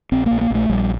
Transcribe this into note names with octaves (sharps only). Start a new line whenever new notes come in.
A#1 C4
A#3
A#1
A#3
A#1 A3
A#1 G3